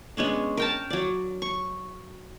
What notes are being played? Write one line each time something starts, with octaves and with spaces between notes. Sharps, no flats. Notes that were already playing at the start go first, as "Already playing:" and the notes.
G#3 B3 C#4 D4
A#4 G5 A5
F#3 D5
C#6